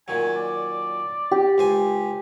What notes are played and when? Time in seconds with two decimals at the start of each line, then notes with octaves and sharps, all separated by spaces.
0.08 A#2 D#3 F#3 G#5
0.36 D5
1.31 G4
1.58 C#2 C5 G#5